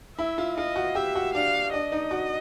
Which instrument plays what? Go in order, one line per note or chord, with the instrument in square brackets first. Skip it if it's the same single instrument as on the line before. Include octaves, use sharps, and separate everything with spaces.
[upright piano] E4 [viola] E5
[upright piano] F4
[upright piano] F4 [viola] D#5
[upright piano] F#4
[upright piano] G4 [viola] E5
[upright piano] F#4
[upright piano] D4 [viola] F5
[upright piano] D4 [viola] D#5
[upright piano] D#4
F#4